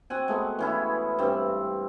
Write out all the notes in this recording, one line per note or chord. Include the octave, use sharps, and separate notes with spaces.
C4 F#4 F#5 G#5
G#3 A3 B3
E3 C#4 E4
G2 C4